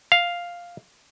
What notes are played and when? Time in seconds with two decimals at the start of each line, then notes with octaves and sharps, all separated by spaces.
0.12 F5